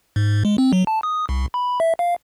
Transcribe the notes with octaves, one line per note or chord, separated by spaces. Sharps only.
G#2
G#3
C4
F#3
A5
D#6
C2
B5
E5
F5